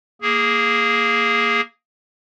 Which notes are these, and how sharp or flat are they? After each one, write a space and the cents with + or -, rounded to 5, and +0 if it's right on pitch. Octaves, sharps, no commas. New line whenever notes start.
A#3 +0 G#4 +0